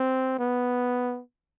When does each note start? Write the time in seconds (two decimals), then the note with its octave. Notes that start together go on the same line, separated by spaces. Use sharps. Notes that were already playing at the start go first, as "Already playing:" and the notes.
Already playing: C4
0.39 B3